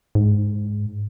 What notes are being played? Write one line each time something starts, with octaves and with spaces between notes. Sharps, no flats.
G#2